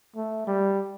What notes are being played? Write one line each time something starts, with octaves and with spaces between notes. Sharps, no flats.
A3
G3